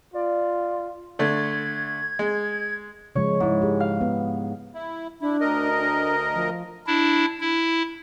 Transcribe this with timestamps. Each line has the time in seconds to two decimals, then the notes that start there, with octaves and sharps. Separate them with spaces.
0.14 F4 D5
1.19 D3 A3 G#6
2.19 G#3
3.15 C#3 F3 G#3 C#5
3.40 G#2 D#4 E4
3.62 G4 G#4
3.80 F5
4.01 B3
4.75 E4
5.21 D4 E4
5.40 D2 A#4 D#5
5.79 D4
6.34 F3
6.87 D4 E4
7.40 E4